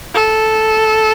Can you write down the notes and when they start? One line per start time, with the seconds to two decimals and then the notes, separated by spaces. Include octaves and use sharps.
0.14 A4